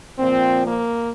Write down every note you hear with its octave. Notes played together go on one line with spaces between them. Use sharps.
A#2 F3 C4
A#3